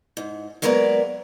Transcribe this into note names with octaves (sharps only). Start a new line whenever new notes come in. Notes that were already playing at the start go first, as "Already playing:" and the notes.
G#2
F#3 G#3 A#3 B3 A#4 D5